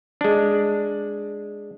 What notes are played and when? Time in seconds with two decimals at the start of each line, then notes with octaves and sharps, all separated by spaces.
0.21 G#3 D4